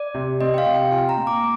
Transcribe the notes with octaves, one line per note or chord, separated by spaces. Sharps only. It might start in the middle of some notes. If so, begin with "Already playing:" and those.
Already playing: D5
C3
C4 D#5
G5
F5
C3
G5
F4 G#5
A#5
A#2
D6